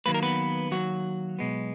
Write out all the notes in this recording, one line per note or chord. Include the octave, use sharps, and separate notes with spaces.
D#3 F#3 A#3 B4
A#4
B3 B4
F#3 F#4
B2 G#3 B3